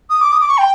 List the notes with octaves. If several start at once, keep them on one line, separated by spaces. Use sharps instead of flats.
D#6
D6
D#6
D6
C#6
G5